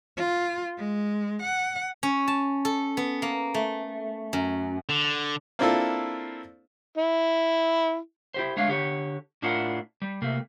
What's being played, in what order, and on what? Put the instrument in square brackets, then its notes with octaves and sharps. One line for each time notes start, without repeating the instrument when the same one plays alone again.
[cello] F4
G#3
F#5
[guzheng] C#4
A5
A4
B3
A#3
A3
F#2
[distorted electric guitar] D3
[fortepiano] A#3 C4 D4 E4 F4 A4
[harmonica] E4
[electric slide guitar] E4 G4 C5
G#3 A3 D4 C#5 F5
D3 G4 C#5
A2 D4 E4 F4 A#4 F#5
G3
C3 A3 A#3